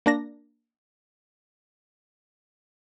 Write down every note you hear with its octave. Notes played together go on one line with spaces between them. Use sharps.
A#3 D4 A#6